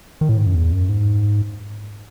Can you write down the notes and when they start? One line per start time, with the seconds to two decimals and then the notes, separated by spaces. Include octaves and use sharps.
0.21 D#3
0.29 A2
0.38 G#2
0.46 F#2
0.55 E2
0.72 F#2
0.89 G#2